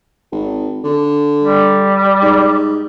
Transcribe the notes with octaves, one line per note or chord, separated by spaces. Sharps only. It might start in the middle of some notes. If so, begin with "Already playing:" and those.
G#1
D3
G3
G#2